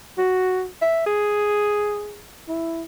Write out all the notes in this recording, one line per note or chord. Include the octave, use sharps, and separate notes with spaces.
F#4
E5
G#4
E4